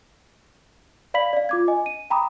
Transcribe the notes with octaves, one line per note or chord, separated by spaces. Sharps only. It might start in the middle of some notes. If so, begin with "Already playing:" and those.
D5 F5 B5 B6 F#7
D5 F5
F4 D6 G#6
D#5 G#5
D#7
G5 A#5 B5 D6 D#6